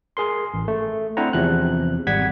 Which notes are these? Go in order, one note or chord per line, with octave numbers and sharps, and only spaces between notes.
G#4 A#4 C6
A1
A3
C4 D4 E4 C5 F#5 A#5
E2 C3 F3 F#6
G#1 G3 F#5 G#6 B6